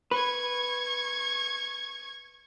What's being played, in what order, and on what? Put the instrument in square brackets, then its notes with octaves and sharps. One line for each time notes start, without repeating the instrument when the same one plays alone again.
[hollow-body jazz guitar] B4 [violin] C#6 G#6